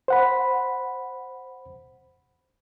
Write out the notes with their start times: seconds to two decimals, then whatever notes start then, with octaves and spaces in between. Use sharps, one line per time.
0.08 C5 F#5 B5